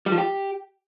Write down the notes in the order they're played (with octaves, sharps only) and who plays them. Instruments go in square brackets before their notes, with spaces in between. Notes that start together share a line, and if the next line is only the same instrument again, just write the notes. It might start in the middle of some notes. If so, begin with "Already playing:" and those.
[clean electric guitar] G3
F3
G4